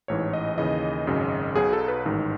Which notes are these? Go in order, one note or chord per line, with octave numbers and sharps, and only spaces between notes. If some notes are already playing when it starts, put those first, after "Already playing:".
A1 G#2 E3 C#5
D#5
D#2 C#3 E3 D#5
G#1 F#2 C#3
B1 B2 F#3 G#4
A4
B4
A1 G#2 D#3